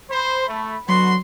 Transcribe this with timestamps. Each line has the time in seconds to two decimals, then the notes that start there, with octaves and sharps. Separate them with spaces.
0.11 C5 B5
0.48 A3
0.88 D3 F#3 B3 F#4 C6